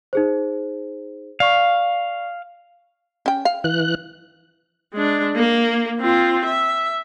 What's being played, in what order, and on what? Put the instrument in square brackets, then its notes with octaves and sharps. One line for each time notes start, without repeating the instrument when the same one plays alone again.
[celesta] D#4 G#4 C5
[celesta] D5 C#6 [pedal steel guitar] F5
[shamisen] C#4 G5
F5
[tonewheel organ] E3 F#6
[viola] G#3 D4
A#3
C4 F4
E5